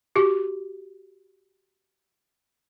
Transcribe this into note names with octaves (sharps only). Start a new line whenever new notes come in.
F#4 G4